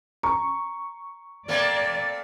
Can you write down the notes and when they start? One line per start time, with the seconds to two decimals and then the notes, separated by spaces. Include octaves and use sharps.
0.23 A#5 C#6
1.48 A3 A#3 C4 D5